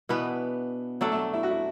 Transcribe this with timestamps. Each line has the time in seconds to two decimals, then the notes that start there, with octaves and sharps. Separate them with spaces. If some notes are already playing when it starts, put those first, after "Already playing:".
0.09 B2 E3 B3 D4 B4
1.01 F#3 A3 D4 A4
1.12 A3
1.34 E4
1.43 F#4
1.51 E4